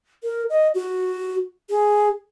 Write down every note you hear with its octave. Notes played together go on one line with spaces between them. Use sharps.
A#4
D#5
F#4
G#4